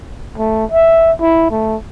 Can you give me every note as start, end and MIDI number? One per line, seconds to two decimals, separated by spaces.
0.38 0.65 57
0.72 1.12 76
1.21 1.50 64
1.51 1.76 57